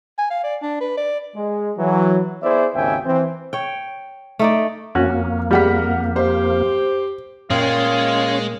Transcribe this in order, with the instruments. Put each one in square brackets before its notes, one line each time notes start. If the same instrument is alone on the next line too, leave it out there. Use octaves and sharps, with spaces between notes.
[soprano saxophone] G#5
F5
D5
D4
B4
D5
[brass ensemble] G#3
E3 F#3
B3 E4 G#4 C5 D5 E5
G#1 D#2 C#3 E5 G5 G#5
E3 C4
[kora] C#5 G5
A3 D#4 D5
[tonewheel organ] F2 A#3 [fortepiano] C#4 F#4
[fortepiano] G3 [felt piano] G#4 F#5 B6 [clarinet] A#4
[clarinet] G4 [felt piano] C5
[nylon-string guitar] A#2 F5 G5 [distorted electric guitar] G#3 [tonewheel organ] C#4 C#5 [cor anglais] F4